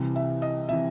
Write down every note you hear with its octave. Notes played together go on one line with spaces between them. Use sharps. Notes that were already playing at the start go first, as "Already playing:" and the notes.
Already playing: C2 C3 E3
E5
D#5
C3 E3 E5